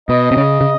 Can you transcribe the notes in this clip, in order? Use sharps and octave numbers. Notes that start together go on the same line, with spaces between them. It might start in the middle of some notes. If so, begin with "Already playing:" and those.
B2 D#5
C3
C#3
C#3